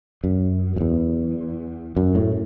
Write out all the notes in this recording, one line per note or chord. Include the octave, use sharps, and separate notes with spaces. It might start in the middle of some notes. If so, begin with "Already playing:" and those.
F#2
F#2
E2
F#2
A2